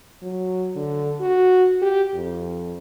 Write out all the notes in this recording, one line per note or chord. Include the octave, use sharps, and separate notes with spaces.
F#3
D3
F#4
G4
F2